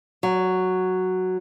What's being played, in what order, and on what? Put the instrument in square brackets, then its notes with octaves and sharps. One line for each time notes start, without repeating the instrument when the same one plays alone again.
[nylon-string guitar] F#3